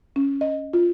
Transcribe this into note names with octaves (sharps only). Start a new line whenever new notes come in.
C#4
D#5
F4